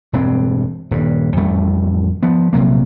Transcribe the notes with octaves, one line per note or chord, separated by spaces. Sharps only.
E1 G2 C4
D#1 G2
A1 F2 G3 A3
F3 B3
A#1 C3 F#3 A#3